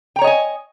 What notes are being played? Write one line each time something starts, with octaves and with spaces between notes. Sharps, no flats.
C#5 D#5 G5 G#5 A#5